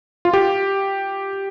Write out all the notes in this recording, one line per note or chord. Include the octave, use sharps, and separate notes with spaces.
F4
G4